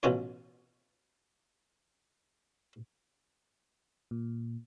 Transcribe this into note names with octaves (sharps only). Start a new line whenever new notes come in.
A1 B2 C#4 F4 C#5
A#2